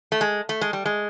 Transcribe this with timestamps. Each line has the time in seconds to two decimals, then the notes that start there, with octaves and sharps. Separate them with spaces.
0.12 A3
0.21 G#3
0.49 A3
0.61 G#3
0.73 G3
0.86 G#3